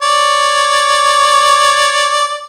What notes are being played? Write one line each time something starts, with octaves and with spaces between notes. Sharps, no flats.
C#5 D5